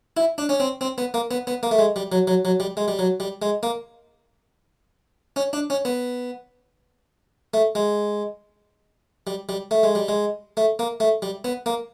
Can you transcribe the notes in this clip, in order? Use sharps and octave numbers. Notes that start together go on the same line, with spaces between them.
E4
D4
C#4
C4
C4
B3
A#3
B3
B3
A#3
A3
G#3
G3
F#3
F#3
F#3
G3
G#3
G3
F#3
G3
G#3
A#3
C#4
D4
C#4
B3
A3
G#3
G3
G3
A3
G#3
G3
G#3
A3
A#3
A3
G3
B3
A#3